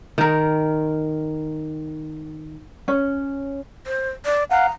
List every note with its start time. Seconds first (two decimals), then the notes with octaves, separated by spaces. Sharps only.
0.18 D#3 A#4
2.88 C#4
3.86 C5
4.26 D5
4.51 F5 F#5 A#5